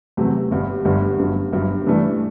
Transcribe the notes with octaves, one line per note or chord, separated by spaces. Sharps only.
E2 C3 F#3 A3
G1 G2 D3 G3
G1 G2 D3 G3
G1 G2 F#3
G1 G2 F#3
G2 E3 A3 D4